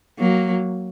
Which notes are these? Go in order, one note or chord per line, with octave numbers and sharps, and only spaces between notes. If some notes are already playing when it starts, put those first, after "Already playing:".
F#3 A#3